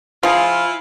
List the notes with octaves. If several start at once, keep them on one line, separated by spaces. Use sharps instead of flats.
F3 E4 F4 G#4